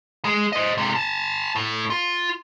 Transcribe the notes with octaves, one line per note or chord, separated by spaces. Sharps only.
G#3
C5 D#5
C3 G#3
G#5 A5
A2
F4